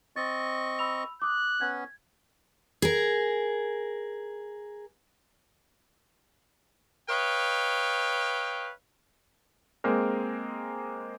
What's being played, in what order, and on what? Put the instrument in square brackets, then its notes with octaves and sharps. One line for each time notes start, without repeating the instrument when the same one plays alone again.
[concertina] C4 D#5 C#6 [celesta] A6
[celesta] B5 E6 F7
[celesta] D6 D#6 [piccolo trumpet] F#6
[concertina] B3 C#4 [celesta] G#6
[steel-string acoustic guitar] G#4 A#4
[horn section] B4 C#5 D#5 F5 G5
[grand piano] G#3 A#3 C4 A#4